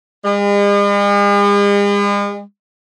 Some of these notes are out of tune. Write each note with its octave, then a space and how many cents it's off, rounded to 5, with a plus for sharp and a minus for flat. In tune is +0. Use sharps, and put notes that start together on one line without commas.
G#3 -45